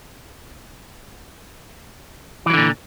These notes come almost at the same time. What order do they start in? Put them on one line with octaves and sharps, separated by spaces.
E3 F#3 D3 A#2